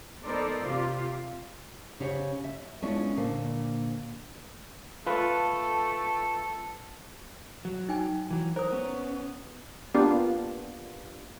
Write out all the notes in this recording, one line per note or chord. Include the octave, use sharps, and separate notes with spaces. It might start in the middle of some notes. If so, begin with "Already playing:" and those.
B3 D#4 A4 A#4 C5 D5
C3 F4 G4
C#3 C#4 G4 C5 C#5 F#5
E5
G#3 B3 C#4 D4 E4 F4
A#2 D3 A#3 C5
A3 F4 A4 B4
F#3
D#4 G5 G#5
E3 F#3
A#4 C5 D#6
B3 C#4
A#3 B3 D4 F4 G4